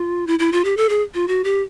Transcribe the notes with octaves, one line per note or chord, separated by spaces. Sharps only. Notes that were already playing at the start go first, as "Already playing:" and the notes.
Already playing: F4
E4
E4
F4
G4
A4
G#4
F4
F#4
G4